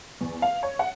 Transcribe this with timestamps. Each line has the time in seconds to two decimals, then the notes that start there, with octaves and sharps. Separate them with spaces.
0.21 E2
0.42 F5
0.63 C#5
0.79 F#5